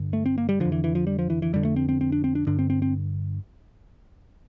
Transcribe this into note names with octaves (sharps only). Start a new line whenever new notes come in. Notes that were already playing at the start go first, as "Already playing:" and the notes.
Already playing: G2 D3
A3
C4
A#3
G3
F2 D3 F3
E3
E3
F3
G3
F3
E3
E3
F2 D3 G3
A3
C4
C4
C4
D4
C4
D4
G2 D3 D4
C4
C4
C4